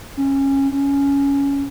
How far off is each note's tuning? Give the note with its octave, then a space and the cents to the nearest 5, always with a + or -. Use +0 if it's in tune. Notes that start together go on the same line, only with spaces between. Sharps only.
C#4 -20
C#4 +10